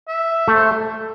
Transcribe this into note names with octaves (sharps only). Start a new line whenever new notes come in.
E5
A3
C5